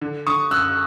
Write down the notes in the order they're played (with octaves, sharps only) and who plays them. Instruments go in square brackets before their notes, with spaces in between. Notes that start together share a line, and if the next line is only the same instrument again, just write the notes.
[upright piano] D3
D3 C#6 D#6
F#2 E6 F#6